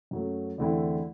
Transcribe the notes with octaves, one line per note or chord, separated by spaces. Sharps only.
F#2 F#3 A3
E2 D3 A3 C4 E4